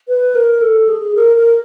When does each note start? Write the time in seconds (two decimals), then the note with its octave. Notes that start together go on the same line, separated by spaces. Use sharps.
0.08 B4
0.35 A#4
0.61 A4
0.89 G#4
1.15 A#4
1.36 A#4